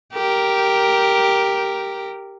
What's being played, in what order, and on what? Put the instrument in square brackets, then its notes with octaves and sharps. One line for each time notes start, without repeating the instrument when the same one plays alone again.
[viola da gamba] G4 A#4